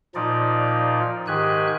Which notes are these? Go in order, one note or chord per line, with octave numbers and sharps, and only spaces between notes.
A#2 F3 D#4 D5
G#2 D#3 G4 G#5 F#6